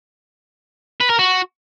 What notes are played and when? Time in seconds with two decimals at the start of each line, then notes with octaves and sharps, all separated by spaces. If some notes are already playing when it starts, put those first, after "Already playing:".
1.00 B4
1.10 A#4
1.19 F#4